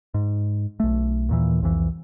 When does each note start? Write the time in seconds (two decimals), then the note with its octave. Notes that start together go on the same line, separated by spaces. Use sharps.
0.14 G#2
0.80 B1 A3
1.29 D#2 A#2 E3
1.62 C2 F2 E3